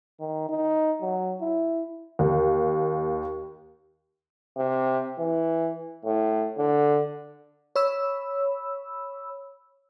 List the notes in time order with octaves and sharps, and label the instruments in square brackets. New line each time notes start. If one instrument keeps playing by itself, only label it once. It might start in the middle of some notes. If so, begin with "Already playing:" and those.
[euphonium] D#3
D#4
F#3
E4
[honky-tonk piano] D#2
[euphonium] C3
E3
A2
D3
[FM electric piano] C#5 B5 E6